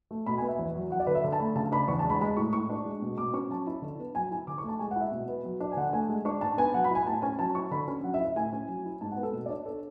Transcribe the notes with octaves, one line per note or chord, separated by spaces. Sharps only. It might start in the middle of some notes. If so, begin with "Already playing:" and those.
A3
B2 B5
B3 G#5
E5
E2
F#3
F#3 F#5
D5
D3 B4
E5
D3
A5
A3 B5
C#3 A5
D4 B5
E2 C#6
A5
G#3
B5
G#3 B5
A2 C#6
A2 C#6
D4
G#3
B2
B2 D6
C#4 C#6
F#3 A5
E4
D3
B3
F#3 G#5
E4 G#5
D3 D6
C#6
A3
A5
G#3 G#5
F#5
E4 E5
B2
B3
F#3
D4
G#5
D3 F#5
A3 G#5
G#3
D4 C#6
G#2 A5
B3 G#5
F#3 F#5
B5
E4 G#5
A2 A5
C#4 G#5
F#3 A5
E4 C#6
D3 B5
C#4
F#3 F#5
E5
E4
E5
A2 G#5
C#4
F#3
E4
G#2 A5
F#5
B3
A4
B2
D5
D4 C#5
A4